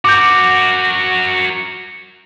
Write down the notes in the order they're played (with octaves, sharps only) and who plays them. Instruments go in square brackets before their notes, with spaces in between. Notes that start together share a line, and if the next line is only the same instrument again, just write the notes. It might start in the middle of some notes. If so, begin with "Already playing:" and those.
[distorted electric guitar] F#4 A#4 [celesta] D6 G6